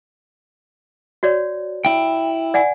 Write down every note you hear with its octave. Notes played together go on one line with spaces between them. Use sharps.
F#4 C#5 D5
E4 G5
D5 F#5 G#5